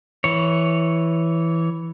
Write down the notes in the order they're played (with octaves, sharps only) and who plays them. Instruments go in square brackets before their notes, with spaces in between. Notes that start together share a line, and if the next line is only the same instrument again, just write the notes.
[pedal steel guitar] E3 C#5